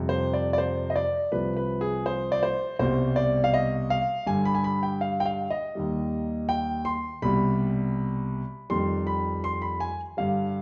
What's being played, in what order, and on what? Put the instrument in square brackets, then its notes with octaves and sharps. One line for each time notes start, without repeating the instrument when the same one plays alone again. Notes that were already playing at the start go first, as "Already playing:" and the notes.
Already playing: [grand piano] F2 C3 G3
C5
D5
D5
C5
D#5
D5
C2 C3 F3 B4
B4
G#4
C5
D5
C5
C2 B2 G3 C5
D5
F5
D#5
F5
G2 D3 G3 G#5
B5
G#5
B5
G5
F5
G5
F5
D#5
D#2 D#3 G3
G5
C6
C2 B2 G3 B5
F2 D#3 G3 C6
B5
C6
B5
G#5
G2 D3 G3 F5